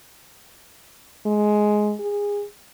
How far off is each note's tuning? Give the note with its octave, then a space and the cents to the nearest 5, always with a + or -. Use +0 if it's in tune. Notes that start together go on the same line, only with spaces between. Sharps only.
G#3 +10
G#4 -25